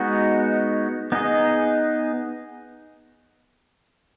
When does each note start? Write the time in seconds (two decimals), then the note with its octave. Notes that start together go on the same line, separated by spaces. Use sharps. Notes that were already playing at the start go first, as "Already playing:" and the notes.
Already playing: G#3 B3 D#4 F#4
1.12 B3 D#4 G#4 D#5